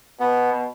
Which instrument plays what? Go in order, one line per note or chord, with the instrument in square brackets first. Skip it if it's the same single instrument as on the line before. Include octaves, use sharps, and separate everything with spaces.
[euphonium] B2 [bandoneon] B3